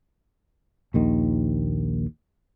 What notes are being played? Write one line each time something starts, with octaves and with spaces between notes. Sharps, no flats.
A#1 D#2 D#3